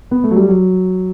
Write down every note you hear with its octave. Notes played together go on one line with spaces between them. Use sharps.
B3
A3
F#3
G3
F#3